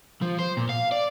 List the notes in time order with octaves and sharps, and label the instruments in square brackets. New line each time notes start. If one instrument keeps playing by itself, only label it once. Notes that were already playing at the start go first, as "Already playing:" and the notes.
[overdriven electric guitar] F3
C5
A#2
F5
D5